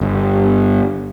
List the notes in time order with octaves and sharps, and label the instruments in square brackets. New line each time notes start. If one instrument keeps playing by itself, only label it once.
[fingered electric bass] G1